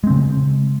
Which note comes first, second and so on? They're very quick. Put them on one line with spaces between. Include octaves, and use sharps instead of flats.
G#3 C4 C#3